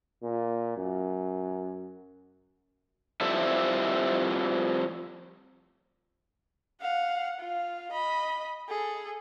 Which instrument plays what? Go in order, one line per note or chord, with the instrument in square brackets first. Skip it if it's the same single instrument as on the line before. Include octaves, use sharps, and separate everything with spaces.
[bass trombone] A#2
F#2
[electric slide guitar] F3 G3 C4 E4 A4 E5
[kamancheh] F5 F#5
F4 F5
D#5 B5
G#4 A4